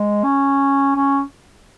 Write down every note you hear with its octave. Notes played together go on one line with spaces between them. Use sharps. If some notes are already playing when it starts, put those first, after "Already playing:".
Already playing: G#3
C#4
C#4